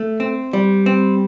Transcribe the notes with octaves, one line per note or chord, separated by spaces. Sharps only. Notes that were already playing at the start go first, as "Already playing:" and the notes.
Already playing: A3
C4
G3
C4